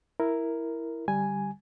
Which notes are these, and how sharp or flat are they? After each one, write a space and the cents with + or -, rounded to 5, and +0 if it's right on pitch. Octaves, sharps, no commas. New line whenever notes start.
E4 +0 A#4 +0
D3 +0 G3 +0 G#5 +0